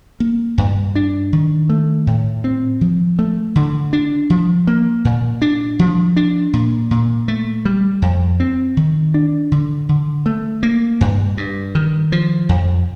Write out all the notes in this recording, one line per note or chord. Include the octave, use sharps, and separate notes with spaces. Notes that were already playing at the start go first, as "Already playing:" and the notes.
A#3
G2
D4
D#3
A3
A2
C4
F3
A3
D3
D4
F3
A#3
A#2
D4
F3
D4
A#2
A#2
A3
G3
F2
C4
D#3
D4
D3
D3
A3
A#3
G2
G2
D#3
F3
F2